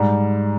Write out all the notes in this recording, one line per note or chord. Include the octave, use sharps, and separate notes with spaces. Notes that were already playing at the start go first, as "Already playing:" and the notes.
Already playing: G#2 G3